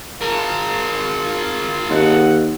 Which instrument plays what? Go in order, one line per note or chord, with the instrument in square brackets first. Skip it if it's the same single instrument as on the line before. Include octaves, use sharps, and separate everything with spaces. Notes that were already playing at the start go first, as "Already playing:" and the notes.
[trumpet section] F4 [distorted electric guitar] G#4 A#4
[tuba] D#2 [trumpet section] A3 D#5 F#5